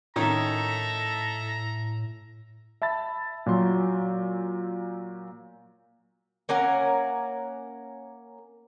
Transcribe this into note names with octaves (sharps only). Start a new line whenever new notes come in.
A2 D#3 C#4 D#4 A4 E5 A#5
E5 A5 B5 A6
A#2 F#3 C6
A#3 C#4 A#4 F#5